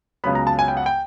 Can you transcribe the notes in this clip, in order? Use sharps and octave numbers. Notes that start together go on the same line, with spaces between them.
C#2 C#3 F#3 B3 B5
A#5
A5
G#5
G5
F#5
G5